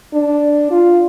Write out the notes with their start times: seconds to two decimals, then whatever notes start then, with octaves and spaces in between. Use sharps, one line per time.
0.14 D4
0.71 F4